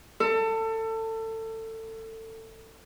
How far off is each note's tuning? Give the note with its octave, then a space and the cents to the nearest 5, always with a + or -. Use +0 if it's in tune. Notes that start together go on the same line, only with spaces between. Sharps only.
A4 +25